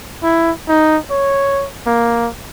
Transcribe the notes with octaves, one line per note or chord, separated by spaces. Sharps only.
E4
D#4
C#5
A#3